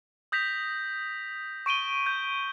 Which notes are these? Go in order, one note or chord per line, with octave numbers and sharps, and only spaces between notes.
D#6 G6 A#6 B6 F7
C#6 D7 D#7 G7
G6